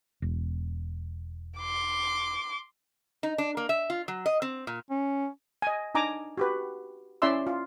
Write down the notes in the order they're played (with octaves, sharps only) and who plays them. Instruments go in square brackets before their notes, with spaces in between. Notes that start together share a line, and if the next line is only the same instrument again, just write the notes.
[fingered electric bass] E1
[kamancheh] C6 D6
[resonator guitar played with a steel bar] D#4
D4
A#3
E5
F4
F#3
D#5
C4
A#2
[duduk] C#4
[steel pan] D#5 G#5
D4 D#4 G#5 A#5 D6
F#4 G4 B4
C#4 E4 D5 E5 C6 E6
F4